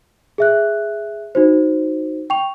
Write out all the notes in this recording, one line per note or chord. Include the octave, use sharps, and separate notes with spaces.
G#4 E5 F#6
D#4 F#4 C5
G5 C#6 F7